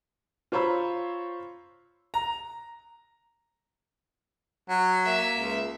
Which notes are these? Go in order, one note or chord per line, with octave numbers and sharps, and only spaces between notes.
F4 C5 C#5 A#5 B5 E6
A#5
F#3
A#3 E5
C#2